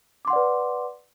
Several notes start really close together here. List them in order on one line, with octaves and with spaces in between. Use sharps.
D6 C6 F#5 D5 B4